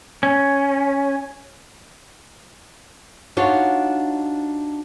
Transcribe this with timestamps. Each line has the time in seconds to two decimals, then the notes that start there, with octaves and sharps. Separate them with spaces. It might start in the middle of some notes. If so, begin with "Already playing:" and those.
0.23 C#4
3.37 D4 D#4 F4 F#4 C#5